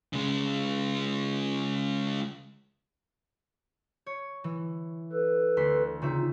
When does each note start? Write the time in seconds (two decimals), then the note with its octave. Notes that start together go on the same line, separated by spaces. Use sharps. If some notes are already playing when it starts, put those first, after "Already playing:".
0.13 C#3 G#3
4.06 C#5
4.44 E3
5.13 A4 B4
5.57 D2 C6 B6
6.02 C#3 C4 D#4 F4 E5